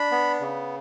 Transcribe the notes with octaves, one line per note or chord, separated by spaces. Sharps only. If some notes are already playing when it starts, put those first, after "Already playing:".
Already playing: D4 B5
B3
C#3